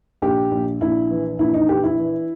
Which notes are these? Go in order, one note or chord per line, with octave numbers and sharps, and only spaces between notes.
A#1 G4
A#1
A#1 E4
E3
A#1 E4
D#4
E3 G4
E4
E3